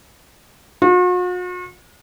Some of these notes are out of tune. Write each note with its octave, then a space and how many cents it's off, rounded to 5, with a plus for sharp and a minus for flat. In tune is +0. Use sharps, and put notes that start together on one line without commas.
F#4 -45